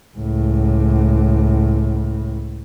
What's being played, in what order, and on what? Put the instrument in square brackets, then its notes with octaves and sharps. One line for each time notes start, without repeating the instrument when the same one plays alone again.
[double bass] C#2 A2